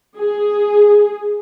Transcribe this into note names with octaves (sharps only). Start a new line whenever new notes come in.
G#4